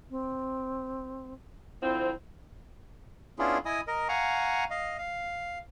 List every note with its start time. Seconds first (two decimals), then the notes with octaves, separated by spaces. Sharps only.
0.11 C4
1.82 D3 F3 C4 E4
3.39 B3 C#4 D4 E4 F4 G#4
3.65 E4 D#5 G#5 D#6
3.88 A#4 D#5
4.09 F5 F#5 G#5 A#5 C#6
4.70 D#5 F5
4.98 F5